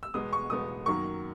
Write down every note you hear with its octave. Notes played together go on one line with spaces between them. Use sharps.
E6
E2 B2 G#3 B3 D#6
C#6
E2 B2 G#3 B3 D#6
F#2 D#3 F#3 A#3 C#6